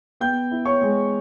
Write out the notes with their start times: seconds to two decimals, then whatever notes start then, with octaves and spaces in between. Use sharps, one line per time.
0.20 B3 G5 G6
0.51 E4
0.65 C#5 C#6
0.81 G#3